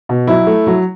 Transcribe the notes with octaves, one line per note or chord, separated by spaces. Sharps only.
B2
F#3 E4
A3
F#3